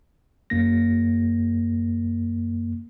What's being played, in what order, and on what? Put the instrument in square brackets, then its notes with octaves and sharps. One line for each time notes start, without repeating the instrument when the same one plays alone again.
[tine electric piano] F#2 A#3 A#6